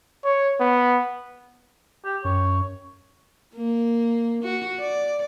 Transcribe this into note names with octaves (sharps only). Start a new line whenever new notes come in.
C#5
B3
G4
F#2 C#5
A#3
F#4
D5